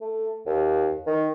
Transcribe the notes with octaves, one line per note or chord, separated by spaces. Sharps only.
A3
D#2
D#3